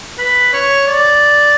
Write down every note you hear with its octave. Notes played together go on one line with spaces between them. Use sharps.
B4
C#5
D5